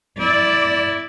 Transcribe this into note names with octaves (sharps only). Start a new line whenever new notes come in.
E4 D5